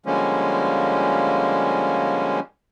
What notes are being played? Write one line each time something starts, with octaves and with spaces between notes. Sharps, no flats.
D3 F3 G3 G#3 A#3 C#4